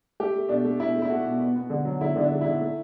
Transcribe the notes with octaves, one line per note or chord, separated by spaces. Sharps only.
A3 G4
A3
B2 D4
A3
B2 E4
A3
E4
A3 F#4
B2
B3
B3
D3
F#3
D3 E4
D3
D4
D3
E4
D3
A3